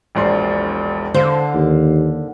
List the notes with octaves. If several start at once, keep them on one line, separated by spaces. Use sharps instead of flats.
E1 A#1 C6
D3 C5 F5
D#2